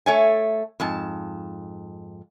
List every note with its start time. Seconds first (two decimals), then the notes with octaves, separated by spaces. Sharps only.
0.06 A3 C#5 G#5
0.80 F2 G#2 A5